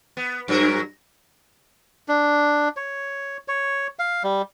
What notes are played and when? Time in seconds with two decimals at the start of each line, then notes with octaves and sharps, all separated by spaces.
0.17 B3
0.48 G2 F#3 A#4
2.08 D4
2.77 C#5
3.48 C#5
3.99 F5
4.23 G3